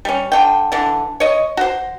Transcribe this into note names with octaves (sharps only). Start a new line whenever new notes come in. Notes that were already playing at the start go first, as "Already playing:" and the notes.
G3 C#4
D3 G5
D3 E3
C#5 D#5
F#4 C5